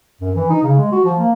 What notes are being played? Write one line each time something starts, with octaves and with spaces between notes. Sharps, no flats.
F#2
E3
D#4
C#3
G#3
F#4
F3
A#3